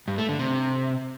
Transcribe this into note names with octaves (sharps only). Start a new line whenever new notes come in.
G2
A3
D3
C3